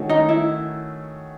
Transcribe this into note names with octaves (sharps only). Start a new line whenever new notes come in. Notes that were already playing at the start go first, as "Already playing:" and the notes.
Already playing: D#3 A3 C#4 F#4
D#4
E4